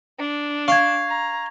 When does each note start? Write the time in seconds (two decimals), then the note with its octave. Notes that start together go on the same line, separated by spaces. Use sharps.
0.16 D4
0.68 F5 C#6 G#6
1.07 A#5